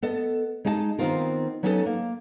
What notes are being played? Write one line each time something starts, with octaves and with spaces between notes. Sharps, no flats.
B3 A4 D#5
G#3 D#4 D#5 F#5 A5
D#3 B3 C4 D#4 F4 A#4
F#3 B3 C#4 D#4 G4 A4
A#3